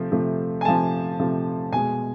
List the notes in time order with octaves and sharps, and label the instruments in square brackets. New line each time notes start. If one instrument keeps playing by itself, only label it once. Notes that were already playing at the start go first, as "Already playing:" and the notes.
Already playing: [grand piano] C3 F3 A3
C3 F3 A3
G#5
C3 F3 A3 A5
C3 F3 A3
B2 G#3 G#5